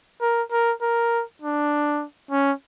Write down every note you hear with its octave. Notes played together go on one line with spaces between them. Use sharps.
A#4
A#4
A#4
D4
C#4